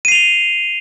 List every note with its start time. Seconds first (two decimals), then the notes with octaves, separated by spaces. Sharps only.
0.05 D#7
0.08 C7
0.12 F7
0.15 G7